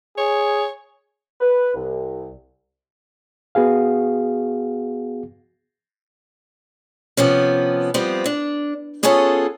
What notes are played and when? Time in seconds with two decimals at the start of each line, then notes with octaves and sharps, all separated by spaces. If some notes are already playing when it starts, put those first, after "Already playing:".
0.18 G#4 C#5
1.40 B4
1.74 C2
3.55 B3 F#4 G#4 F5
7.17 C3 F3 B3 C#4
7.94 F3 G3 B3 C4
8.26 D4
9.03 B3 C#4 F4 G#4 A4 C#5